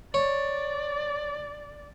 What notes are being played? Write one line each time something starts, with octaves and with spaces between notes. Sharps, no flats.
C#5 D5